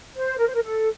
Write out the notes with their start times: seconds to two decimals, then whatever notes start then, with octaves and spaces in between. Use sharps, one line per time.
0.13 C5
0.38 A#4
0.47 C5
0.54 A#4
0.62 A4